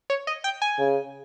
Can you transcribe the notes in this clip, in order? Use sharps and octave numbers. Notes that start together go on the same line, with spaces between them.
C#5
D#5
G5
G#5
C#3